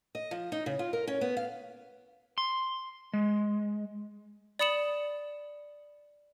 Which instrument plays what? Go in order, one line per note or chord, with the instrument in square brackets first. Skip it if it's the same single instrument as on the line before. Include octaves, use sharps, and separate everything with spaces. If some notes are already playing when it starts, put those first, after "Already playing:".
[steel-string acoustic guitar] D#5
F3
D#4
C#3
F4
A#4
C#4
B3
F5
[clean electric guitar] C6
G#3
[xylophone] D5 B5 D#6 C#7 E7 F#7